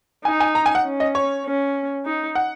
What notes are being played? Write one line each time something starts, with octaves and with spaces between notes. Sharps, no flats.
D#4 G#5
G#5
A#5
G#5
F#5
C#4
D#5
C#5
C#4
D#4
F#5